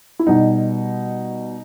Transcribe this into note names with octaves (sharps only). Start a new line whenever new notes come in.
E4
B2 G3 D#4